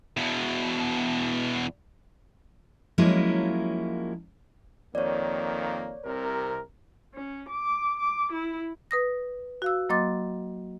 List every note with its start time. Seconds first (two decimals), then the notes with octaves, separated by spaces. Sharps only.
0.17 E2 B2
2.98 F3 F#3 G#3 A#3 C#4 E4
4.95 F2 D#3 A#3 C#5 D5
6.04 C2 C3 A#4
7.14 C#4
7.49 D6
8.00 D6
8.32 E4
8.91 B4 D#6 A#6
9.62 F#4 F5 E6
9.89 F#3 A#3 D#5 C6 D6 A6